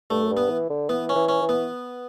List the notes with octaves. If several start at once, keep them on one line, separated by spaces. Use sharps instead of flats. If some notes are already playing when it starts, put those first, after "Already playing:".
G2 A3
F#2
G2
B3
E3
D3
E3 B3
C#4
E3
C#4
E3
B3